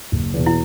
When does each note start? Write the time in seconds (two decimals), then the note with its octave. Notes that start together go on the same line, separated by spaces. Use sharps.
0.12 F#1
0.34 E2 B2
0.46 E4